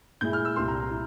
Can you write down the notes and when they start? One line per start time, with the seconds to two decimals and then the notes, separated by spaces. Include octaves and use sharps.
0.21 A#2 G#3 E4 G6
0.33 F6
0.45 E6
0.56 C2 A#2 G3 A#3 C6
0.68 A#5
0.80 A#5
0.91 E4